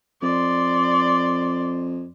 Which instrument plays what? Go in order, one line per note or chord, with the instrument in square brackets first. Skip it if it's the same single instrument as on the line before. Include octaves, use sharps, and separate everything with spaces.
[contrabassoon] F2 [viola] D5 C6